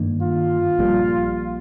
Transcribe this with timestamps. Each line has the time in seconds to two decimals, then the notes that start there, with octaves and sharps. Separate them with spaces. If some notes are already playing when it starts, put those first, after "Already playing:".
Already playing: G2 D#3 A#3 D4
0.22 F4
0.79 A#1 A#2 G3